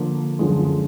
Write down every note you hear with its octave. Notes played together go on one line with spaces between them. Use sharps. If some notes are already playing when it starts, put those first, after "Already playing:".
Already playing: D3 F3 A#3
F#2 D3 F3 G#3